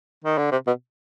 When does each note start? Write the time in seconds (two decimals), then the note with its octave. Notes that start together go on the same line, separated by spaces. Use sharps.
0.24 D#3
0.38 D3
0.51 C3
0.67 B2